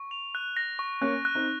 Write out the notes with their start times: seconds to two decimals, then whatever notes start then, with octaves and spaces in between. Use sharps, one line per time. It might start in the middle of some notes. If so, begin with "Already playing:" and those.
Already playing: C#6
0.11 F7
0.35 F#6
0.57 A#6
0.79 C#6
1.01 A#3 C#4 F#6
1.25 F#6
1.35 C4 D#4